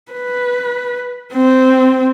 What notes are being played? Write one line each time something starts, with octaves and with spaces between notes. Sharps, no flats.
B4
C4